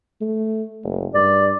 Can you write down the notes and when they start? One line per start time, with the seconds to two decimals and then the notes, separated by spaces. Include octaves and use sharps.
0.21 A3
0.84 F#1
1.15 G2 D5